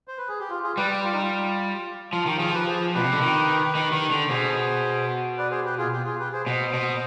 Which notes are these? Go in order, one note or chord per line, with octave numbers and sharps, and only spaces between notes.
C5
B4
G#4
G4
F4
F4 G#4
G3 G4 B4
G4
F4
D#4
F4
F3 F4
D#3 G4
F3 F4 G#4
G4 B4
G#4 C5
B2 G4 B4
C3
D3
D#3
D#3
D#3
D3
B2 G#4 C5
B4 D5
G#4 C5
G4 B4
F4 G#4
G4
F4 G#4
G4 B4
G#4 C5
B2 C5 D#5
B2